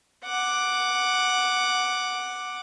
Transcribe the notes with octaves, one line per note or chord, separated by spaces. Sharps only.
F#5 D6